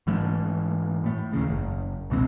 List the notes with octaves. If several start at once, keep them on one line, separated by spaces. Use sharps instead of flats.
G#2 E3 A3
A2 A3
D#2 C#3
F#1
C#2 B2 E3 C4